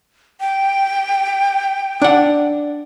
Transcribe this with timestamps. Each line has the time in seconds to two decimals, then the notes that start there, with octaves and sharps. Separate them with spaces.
0.40 G5
2.02 D4 F#5